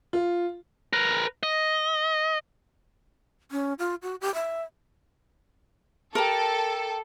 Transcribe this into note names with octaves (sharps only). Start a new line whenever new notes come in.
F4
A#4 B4
D#5
C#4
F4
F#4
G4
E5
G4 A4 A#4